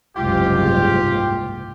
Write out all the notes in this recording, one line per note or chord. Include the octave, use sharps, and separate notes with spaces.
F#1 C2 G#2 F4 G4